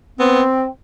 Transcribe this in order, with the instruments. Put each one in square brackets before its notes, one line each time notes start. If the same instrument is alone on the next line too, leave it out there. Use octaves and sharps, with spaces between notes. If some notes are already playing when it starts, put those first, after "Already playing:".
[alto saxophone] B3 [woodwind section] C4